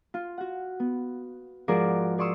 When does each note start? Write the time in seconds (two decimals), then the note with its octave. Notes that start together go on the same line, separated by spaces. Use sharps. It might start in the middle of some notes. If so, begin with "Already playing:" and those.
0.14 F4
0.38 F#4 F#5
0.80 B3
1.68 G#2 F3 F#4 G#4 A#4 D5
2.18 G#4 D5 C6 C#6 D#6 E6